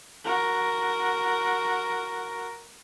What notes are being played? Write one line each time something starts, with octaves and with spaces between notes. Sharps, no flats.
F#4 A#4